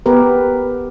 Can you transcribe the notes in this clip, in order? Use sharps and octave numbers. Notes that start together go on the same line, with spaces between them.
B3 G4 A#4 B4